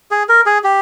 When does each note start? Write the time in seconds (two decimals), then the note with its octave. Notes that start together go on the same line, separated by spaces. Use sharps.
0.11 G#4
0.29 A#4
0.46 G#4
0.64 G4